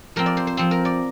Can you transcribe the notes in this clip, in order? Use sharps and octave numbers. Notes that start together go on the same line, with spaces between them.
F3 C4 A#4
D5
C5
C5
F3 C4 C5
A#4
D5